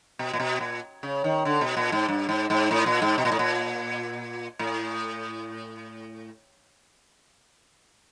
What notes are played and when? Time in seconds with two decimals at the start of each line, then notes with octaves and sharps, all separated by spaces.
0.19 B2
0.33 A#2
0.40 B2
0.61 A#2
1.03 C#3
1.24 D#3
1.45 D3
1.61 B2
1.77 A#2
1.92 G#2
2.09 G2
2.29 G#2
2.50 G#2
2.71 A2
2.86 A#2
3.02 G#2
3.18 B2
3.25 A#2
3.32 A2
3.39 A#2
4.59 A2